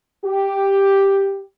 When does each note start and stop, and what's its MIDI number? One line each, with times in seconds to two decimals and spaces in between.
0.25 1.43 67